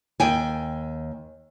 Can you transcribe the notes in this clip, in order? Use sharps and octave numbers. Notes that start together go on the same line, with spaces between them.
D#2 G5 G#5